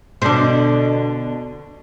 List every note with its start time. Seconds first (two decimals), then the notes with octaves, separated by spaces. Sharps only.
0.22 B2 D3 D4 C5